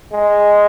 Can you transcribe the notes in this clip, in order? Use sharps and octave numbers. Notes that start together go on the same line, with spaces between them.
G#3